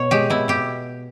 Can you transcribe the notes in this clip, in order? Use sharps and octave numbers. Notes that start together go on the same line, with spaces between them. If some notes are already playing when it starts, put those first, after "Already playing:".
Already playing: B2 C#5
G#3 G4
B2 E4
B2 G4